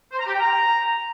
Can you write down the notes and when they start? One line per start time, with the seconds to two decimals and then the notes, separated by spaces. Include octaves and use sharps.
0.12 C5
0.19 A#5
0.26 G4
0.33 G5
0.40 A#5